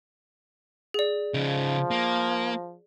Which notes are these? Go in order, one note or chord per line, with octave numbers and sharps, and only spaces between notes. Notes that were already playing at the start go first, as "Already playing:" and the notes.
G#4 D5
C#3 F3 D#4
A#3